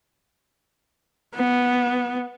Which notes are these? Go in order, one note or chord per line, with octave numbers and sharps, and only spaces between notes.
B3